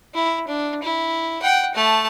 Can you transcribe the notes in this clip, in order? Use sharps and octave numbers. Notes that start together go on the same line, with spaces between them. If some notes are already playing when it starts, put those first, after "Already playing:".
E4
D4
E4
F#5 G5
A3 A5